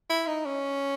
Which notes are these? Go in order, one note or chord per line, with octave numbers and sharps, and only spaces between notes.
E4
D#4
C#4